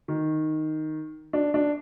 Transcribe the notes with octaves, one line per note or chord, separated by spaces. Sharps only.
D#3
D4
D4